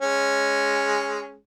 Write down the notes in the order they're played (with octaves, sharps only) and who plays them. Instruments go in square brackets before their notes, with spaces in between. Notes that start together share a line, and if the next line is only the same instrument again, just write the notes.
[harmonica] G#3 C#4